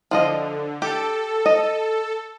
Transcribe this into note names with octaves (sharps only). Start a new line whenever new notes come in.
D3 F3 F4 D#5
G4 A4
D#5